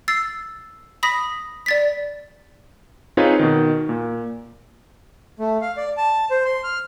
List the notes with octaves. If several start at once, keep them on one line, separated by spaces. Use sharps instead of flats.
E6 A6 C7
B5 D#6 A#6 B6
D5 A6 B6
C4 D#4 F4 G#4 B4 C#5
B2 D#3
A#2
A3
F5
D5
A5
C5
C6
F6